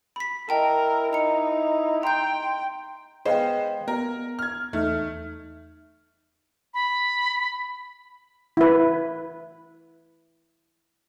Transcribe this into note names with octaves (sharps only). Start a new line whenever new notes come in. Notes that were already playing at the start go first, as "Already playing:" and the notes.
B5 B6
E4 A#4 D#5 G5 A5
D#4 A#5 C#7
G5 A#5 C6 G6
G#3 B3 C5 D#5 F5 G5
B3 A#4
F6 G#6
E2 A3 D#4 F6
B5
E4 B4